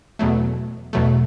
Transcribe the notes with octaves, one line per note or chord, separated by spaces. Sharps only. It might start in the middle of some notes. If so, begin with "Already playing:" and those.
E2 B2 F#3 A3
E2 B2 F#3 A3